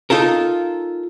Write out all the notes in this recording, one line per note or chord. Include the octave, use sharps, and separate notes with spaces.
D#4 F4 A4 A#4